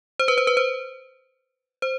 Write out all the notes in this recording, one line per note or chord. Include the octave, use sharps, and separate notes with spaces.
C5
B4
C5
B4
C5
C5